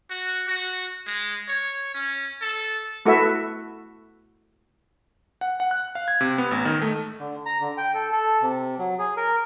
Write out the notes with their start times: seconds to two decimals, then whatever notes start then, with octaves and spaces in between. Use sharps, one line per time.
0.10 F#4
0.48 F#4
1.07 G#3
1.48 C#5
1.95 C#4
2.42 A4
3.05 A3 E4 F#4 A4 B4 E5
5.41 F#5
5.60 F#5
5.71 F#6
5.95 F5
6.08 G#6
6.21 C3
6.38 B3
6.51 A1
6.65 D#3
6.82 A3
7.19 D3
7.46 A#5
7.60 D3
7.78 G5
7.94 A4
8.12 A4
8.41 C3
8.78 F#3
8.99 G#4
9.17 A#4